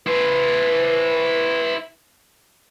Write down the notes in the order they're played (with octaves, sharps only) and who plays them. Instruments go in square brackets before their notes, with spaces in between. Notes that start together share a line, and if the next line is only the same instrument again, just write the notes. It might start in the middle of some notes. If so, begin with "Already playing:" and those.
[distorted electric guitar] E4 C5 [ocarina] B4